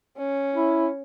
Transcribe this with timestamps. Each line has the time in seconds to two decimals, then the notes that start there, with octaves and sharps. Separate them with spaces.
0.18 C#4
0.55 E4